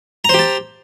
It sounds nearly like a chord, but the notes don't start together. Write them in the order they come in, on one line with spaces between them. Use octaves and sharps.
A#5 C5 G4 A5